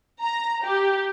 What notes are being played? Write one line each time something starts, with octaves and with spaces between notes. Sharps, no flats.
A#5
G4